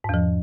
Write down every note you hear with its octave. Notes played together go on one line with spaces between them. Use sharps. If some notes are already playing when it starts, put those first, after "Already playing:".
E2 G#2 F3